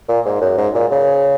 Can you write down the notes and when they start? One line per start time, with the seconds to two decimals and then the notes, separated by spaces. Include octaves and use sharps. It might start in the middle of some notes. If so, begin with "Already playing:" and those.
0.09 A#2
0.26 G#2
0.42 F#2
0.58 G#2
0.75 A#2
0.91 C#3